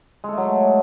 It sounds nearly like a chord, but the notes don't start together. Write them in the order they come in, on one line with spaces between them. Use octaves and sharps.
G#3 A4 A3 F#3